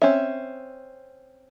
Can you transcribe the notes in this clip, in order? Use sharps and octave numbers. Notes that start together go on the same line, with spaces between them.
C4 C#4 E5